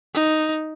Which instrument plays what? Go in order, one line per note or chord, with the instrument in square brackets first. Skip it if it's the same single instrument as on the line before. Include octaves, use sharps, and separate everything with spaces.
[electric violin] D#4